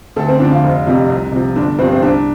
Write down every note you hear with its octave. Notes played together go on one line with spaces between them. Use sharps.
D2 A4
C4
D3 F3 D4
F4
F1
F2 C3 F3
C2
C3 F3
G1 D4
G2 F3 C4
C4
C2 D4